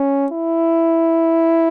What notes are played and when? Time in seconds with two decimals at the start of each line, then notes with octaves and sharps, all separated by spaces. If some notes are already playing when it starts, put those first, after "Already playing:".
Already playing: C#4
0.32 E4